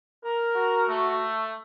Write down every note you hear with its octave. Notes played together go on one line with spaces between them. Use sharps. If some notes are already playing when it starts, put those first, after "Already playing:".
A#4
F#4
A3